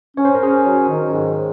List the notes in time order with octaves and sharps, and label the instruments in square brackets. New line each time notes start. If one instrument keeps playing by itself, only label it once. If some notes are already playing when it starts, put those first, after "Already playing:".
[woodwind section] C#4 [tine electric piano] C#5
[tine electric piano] C5
A#4
[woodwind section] C#4 [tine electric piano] G#4 C5
[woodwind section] F#3
D#3
G#2